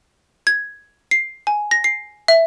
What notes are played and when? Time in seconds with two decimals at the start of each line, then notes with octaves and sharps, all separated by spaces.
0.47 G#6
1.11 C7
1.47 G#5
1.71 A#6
1.84 C7
2.28 E5